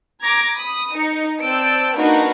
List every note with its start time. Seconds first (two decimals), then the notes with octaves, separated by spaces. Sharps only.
0.23 A#5 D6 G#6 A#6
0.57 B5 D#6
0.95 D#4 C#7
1.43 C4 D5 A5 E6 G6 D7
1.96 A#3 D4 D#4 F#4 A#4 B4